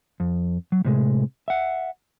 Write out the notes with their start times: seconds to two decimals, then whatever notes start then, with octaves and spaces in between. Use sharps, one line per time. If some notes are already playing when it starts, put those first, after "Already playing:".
0.20 F2
0.72 F#3
0.85 A2 C3 G#3
1.48 E5 F#5